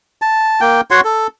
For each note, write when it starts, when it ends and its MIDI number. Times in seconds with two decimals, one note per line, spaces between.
0.22 0.61 81
0.61 0.81 58
0.61 0.81 79
0.91 1.01 66
0.91 1.01 73
0.91 1.01 78
0.91 1.01 84
1.04 1.27 69